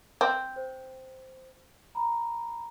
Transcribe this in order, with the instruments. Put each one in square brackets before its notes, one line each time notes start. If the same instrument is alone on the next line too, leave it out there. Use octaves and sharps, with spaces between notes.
[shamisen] C4
[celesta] C5
A#5 B5